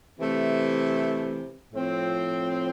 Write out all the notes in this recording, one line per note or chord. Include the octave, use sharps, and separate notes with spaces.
C3 E3 A3
A2 F3 C4